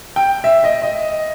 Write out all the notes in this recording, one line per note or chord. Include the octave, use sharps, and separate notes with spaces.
G5
E5
D#5
D#5